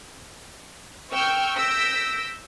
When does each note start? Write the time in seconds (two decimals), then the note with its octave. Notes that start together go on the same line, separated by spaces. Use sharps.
1.12 G5 C#6 E6 F6 G6
1.57 E6 G6 A#6 B6 D7